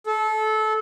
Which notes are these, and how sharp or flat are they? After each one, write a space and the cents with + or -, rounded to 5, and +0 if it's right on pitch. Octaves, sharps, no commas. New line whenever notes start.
A4 -25